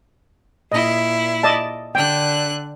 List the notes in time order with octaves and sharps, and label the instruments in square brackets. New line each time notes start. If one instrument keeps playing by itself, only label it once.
[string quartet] A#2 E4 [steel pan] D#5
[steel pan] D5 D#5 A5
[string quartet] D3 D4 F#6 [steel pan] G5